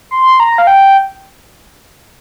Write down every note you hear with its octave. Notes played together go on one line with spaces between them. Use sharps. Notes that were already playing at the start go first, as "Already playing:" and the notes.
C6
A#5
F5
G5